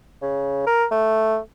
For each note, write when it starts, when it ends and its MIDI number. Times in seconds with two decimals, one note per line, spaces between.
0.22 0.66 49
0.67 0.85 70
0.91 1.38 57